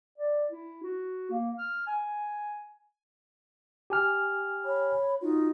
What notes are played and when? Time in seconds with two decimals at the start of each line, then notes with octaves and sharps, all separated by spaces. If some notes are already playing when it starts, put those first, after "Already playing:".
0.18 D5
0.51 E4
0.83 F#4
1.31 A#3
1.58 F6
1.87 G#5
3.90 G4 G#5 F6
4.64 C#5 B5
5.20 D#4 F4 F#4